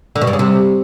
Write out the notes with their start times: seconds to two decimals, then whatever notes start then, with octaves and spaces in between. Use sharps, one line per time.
0.15 D3
0.21 B2
0.27 G2
0.33 C#3
0.39 C3